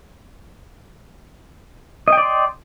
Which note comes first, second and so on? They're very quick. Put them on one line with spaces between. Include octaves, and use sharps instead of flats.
D#5 G5 D5 C6